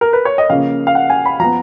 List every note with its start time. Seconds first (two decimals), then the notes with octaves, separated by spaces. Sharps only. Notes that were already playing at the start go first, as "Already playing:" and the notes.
0.01 A#4
0.13 B4
0.25 C#5
0.38 D#5
0.50 C#3 F3 A#3 C#4 F5
0.87 F5
0.95 F#5
1.10 G#5
1.25 B5
1.40 F3 B3 A#5